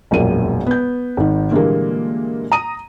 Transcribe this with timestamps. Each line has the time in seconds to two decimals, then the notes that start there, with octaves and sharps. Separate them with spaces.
0.11 E1 A#1 F#2 A#3 D#7
0.67 B3 G6
1.17 G#1 D#3
1.51 A#2 D3 E3 G3 G#3 A#3
2.52 A#5 D#6 D#7